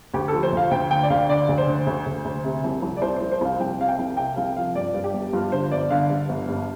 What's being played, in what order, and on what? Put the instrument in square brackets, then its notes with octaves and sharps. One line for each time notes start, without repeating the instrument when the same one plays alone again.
[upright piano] D2 G4
F3 A4
C5
D2 F5
D2 G5
D3 G5
D5
D2 F5
D3 D5
D2
C5
D3
D2
D2
D2
C3
C2
C2
D5
C2 C5
C2 C5
C5
C2 F5
C2 G5
C3 F5
G5
C2
C3 G5
C2 F5
F3 F5
G2 D5
G2
G4
G1
G2 F4
D3 C5
G1 D5
D3 F5
G2
G1
G2